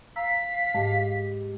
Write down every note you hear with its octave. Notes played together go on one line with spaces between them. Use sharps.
F5 A#5 E6 B6
G#2 G#3 G4